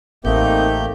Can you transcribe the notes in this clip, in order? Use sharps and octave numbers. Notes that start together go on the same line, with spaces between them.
A1 A3 A#3 C4 D#4 G4 G6